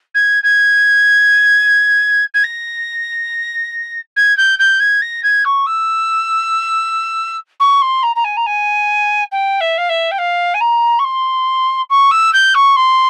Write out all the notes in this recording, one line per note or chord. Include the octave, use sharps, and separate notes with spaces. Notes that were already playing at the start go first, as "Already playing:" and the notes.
G#6
G#6
G#6
A#6
G#6
G6
G6
G#6
A#6
G#6
C#6
E6
C#6
C6
A#5
A#5
G#5
A#5
G#5
G5
E5
F5
E5
G5
F5
G#5
A#5
C#6
C6
C#6
E6
G6
C#6
C6